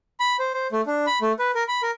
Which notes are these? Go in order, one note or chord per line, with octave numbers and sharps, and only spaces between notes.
B5
C5
C5
A3
D4
B5
A3
B4
A#4
B5
A#4